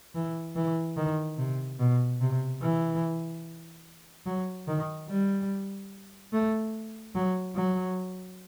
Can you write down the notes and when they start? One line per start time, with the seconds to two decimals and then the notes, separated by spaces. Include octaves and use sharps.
0.15 E3
0.56 E3
0.97 D#3
1.38 C3
1.79 B2
2.21 C3
2.62 E3
4.26 F#3
4.68 D#3
5.09 G3
6.33 A3
7.15 F#3
7.56 F#3